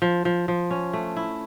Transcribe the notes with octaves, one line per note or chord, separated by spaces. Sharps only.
F3
F3
F3
C#4
A3
E4